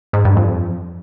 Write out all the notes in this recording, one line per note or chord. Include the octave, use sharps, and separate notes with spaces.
G#2
G2
F2